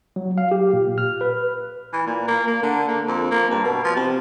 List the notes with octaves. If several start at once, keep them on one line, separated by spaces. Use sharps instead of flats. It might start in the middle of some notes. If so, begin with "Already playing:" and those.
F#3
F5
G4
A#2
F6
B4
E3
A#2
A#3
A#3
D3
A#3
F2
A#3
G2
B2
F3
C3